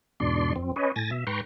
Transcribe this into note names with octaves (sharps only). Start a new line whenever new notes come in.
E2 G#2 B2 D4 D5 C6
F2 C4
C#4 B4 C#5 D#5
A2 G#5 A6 A#6
B2 E5
G#2 B4 G5 A#5 C6 C#6